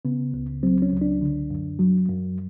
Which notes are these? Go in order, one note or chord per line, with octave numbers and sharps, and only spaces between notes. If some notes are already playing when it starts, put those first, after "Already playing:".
C#3 B3
C#2
F#3 C4
C#4
C#2
D4
D3
F#2
F#3
F#2